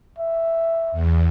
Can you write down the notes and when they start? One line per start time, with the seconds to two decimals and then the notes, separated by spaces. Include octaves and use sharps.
0.19 E5
0.92 E2